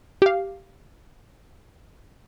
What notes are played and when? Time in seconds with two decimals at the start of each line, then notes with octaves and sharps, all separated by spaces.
0.22 G4 F5